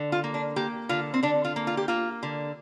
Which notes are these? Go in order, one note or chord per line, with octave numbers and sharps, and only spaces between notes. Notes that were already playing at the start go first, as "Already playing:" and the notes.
Already playing: D3
F4
A#3
D4
A#3 G4
D3 F4
C4
D3 D4
F4
A#3
F4
G4
A#3 F4
D3